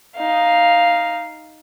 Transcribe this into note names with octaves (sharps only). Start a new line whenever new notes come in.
D#4 F5